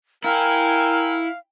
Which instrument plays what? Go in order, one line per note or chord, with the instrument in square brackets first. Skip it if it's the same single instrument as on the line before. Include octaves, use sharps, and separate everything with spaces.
[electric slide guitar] E4 [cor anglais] A#4 [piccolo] F5 [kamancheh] G5 G#5